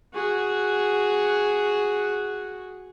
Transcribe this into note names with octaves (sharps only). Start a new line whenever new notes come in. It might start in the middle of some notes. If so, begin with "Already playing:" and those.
F#4 G#4